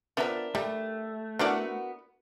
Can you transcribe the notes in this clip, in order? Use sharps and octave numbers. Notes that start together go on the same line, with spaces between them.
F3 B3 D4 A#4 E5
G3 A3
B3 D4 E4 F#4 A#4 D5